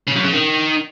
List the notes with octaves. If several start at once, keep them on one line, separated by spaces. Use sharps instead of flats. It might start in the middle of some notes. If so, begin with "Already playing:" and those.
C#3
F#2
C#3
D#3